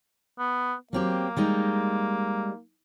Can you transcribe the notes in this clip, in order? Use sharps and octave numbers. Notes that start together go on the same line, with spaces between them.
B3
F#3 A#3 C4 G4
G3 G#3 D#4